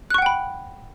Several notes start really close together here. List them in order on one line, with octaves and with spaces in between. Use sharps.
F#6 C#6 F#5 G5 B5